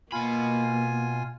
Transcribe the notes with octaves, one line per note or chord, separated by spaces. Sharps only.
B2 A#3 F4 G#5 B5